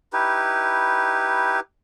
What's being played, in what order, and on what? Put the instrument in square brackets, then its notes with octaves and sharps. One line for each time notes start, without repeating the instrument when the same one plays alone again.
[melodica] D#4 E4 G4 B4